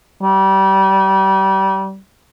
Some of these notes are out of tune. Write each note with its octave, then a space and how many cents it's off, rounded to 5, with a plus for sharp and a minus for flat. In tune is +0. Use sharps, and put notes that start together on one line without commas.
G3 -25